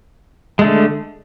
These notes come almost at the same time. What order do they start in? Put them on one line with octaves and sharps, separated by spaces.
G#3 A3 D3